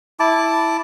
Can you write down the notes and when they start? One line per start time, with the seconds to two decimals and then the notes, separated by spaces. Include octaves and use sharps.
0.20 E4 A5 D6